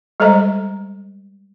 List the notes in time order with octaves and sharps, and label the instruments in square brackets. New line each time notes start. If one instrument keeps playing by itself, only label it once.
[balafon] G3 G#3 A4 C5 D#5 A#5